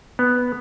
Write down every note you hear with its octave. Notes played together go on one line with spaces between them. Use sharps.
B3